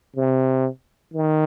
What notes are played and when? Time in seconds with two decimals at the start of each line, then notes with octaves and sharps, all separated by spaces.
0.16 C3
1.14 D#3